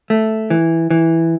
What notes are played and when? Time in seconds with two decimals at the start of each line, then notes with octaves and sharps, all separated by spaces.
0.10 A3
0.50 E3
0.90 E3